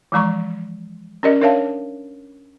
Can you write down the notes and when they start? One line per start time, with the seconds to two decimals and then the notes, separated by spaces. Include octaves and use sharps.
0.12 E3 F3 G#3 A#5 C#6
1.23 C#4 G4 A#4 D5 D#5
1.41 D4 A#4 C#5 E5 F5 A5